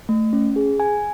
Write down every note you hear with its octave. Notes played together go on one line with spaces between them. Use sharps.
A3
C#4
G#4
G#5